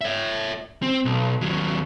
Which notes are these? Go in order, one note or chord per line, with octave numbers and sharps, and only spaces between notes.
C#5 E5
C4
B1
D#2 F#3